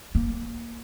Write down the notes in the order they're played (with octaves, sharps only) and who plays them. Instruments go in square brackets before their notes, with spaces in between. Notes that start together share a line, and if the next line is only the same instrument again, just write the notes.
[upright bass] A#3